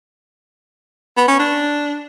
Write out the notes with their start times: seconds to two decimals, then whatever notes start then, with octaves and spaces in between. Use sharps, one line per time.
1.17 B3
1.28 C#4
1.39 D4